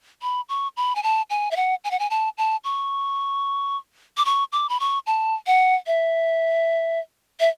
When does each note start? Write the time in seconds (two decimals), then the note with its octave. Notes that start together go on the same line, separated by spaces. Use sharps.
0.22 B5
0.49 C#6
0.77 B5
0.95 G#5
1.03 A5
1.30 G#5
1.51 E5
1.56 F#5
1.84 G#5
1.91 F#5
1.99 G#5
2.10 A5
2.38 A5
2.64 C#6
4.17 D6
4.25 C#6
4.52 D6
4.69 B5
4.80 C#6
5.07 A5
5.47 F#5
5.87 E5
7.40 E5